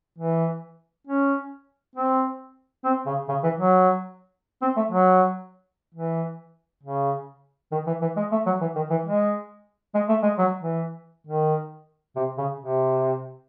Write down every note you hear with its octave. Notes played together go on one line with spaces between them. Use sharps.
E3
C#4
C4
C4
C#3
C#3
E3
F#3
C4
A3
F#3
E3
C#3
D#3
E3
E3
G#3
A3
F#3
E3
D#3
E3
G#3
G#3
A3
G#3
F#3
E3
D#3
C3
C#3
C3